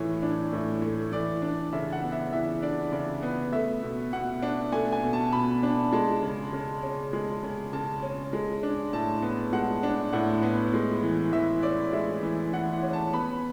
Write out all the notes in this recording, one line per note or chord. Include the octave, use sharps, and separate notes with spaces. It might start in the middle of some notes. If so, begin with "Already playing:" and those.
Already playing: A2 E3 A3 C#5
D4
A2
A3
E3 D5
D4
C#3 E5
F#5
B3
E5
E3 E5
D4 D5
C#3 D5
B3
A3 E5
B2
B2 F#5
D4
A3 G#5
G#5
B2
A5
B2 B5
D4
G#3 A5
C#3
C#3
C#4
G#3
C#3
C#3 A5
C#4
G#3
D4
A2 A5
B3
G#3 F#5
D4
A2 F#5
B3
G#3
E3
E3 E5
C#4 D5
G#3 E5
E3
E3 F#5
F#5
C#4
A5
B3 B5